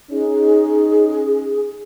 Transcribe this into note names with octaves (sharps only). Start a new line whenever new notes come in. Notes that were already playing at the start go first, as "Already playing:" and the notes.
C#4 D#4 G#4